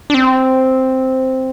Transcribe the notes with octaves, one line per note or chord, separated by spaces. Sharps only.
D4
C4